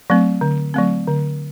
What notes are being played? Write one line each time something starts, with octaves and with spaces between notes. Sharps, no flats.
F#3 A3 C4
D3
F#3 A3 C4
D3